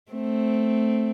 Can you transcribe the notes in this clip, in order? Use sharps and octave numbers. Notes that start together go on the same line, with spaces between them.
A3 C4